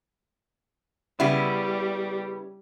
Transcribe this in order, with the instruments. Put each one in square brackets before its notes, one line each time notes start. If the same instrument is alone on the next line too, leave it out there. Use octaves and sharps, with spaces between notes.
[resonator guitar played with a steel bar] C#3 B3 E4 [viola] G3